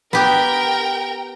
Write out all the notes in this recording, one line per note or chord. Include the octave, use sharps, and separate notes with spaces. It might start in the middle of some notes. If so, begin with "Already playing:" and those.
B3 G4 A#4 G5